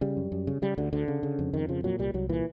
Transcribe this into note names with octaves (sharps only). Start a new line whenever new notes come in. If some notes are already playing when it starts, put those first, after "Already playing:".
C#3 G3
F#2
F#2
C#3
C#3 G3
D2 D3
D2 D3
C#3
C#3
F2
F2 D#3
C#3 F3
A#2 F#3
C2 G3
C2 F#3
A#2 E3